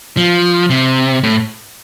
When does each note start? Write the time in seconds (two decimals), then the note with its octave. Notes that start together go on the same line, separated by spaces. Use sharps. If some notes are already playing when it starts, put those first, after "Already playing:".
0.17 F3
0.70 C3
1.23 A2